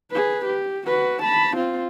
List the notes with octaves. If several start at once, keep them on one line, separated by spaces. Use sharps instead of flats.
G#4 B4
G4
F#4 B4
A5 B5
C4 F4